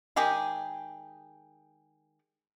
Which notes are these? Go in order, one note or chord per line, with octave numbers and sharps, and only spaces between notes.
D#3 G#3 G4 G#4